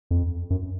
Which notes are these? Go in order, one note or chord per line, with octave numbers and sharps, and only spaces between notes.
F2
F#2